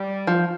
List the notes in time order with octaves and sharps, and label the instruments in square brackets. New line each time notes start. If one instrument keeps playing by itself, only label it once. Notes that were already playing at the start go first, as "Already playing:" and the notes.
Already playing: [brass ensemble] G3
[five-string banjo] F3